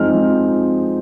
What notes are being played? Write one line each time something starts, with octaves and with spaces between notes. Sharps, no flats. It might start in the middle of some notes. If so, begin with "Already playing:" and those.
Already playing: F3 G#3 C4 D#4 F6
F3